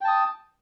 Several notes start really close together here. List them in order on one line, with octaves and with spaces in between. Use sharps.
G5 A5 D#6